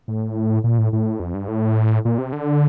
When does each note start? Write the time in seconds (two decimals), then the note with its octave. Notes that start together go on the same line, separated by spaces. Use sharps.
0.08 A2
0.64 A#2
0.78 A2
0.93 A2
1.20 F2
1.34 G2
1.48 A2
2.05 A#2
2.18 C3
2.32 D3